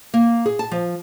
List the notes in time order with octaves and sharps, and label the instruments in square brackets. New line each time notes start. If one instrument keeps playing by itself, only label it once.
[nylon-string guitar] A#3
G#4
A5
F3